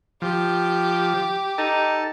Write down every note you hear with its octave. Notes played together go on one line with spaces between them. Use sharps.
F3 G4
D#4 A4